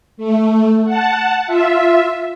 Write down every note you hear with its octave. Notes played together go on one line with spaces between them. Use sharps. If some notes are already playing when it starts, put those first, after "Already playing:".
A3
F#5 A5
F4 E5